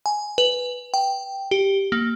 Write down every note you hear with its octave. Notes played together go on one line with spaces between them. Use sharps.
G#5
B4
G5
G4
A#3